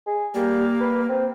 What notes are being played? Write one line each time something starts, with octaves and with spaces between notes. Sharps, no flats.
G#4
G3 A#3
B4
C4